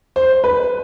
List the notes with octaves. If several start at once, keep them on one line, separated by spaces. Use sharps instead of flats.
C5
B4